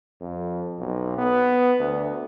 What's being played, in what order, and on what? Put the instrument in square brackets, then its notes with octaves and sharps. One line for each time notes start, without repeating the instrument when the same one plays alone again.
[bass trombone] F2
B1
B3
D2